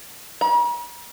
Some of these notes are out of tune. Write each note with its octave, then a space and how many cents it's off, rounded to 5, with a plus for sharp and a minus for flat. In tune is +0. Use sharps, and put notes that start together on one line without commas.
A#5 +45